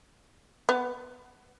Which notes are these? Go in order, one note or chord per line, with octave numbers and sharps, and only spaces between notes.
B3